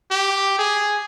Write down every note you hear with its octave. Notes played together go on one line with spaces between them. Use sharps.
G4
G#4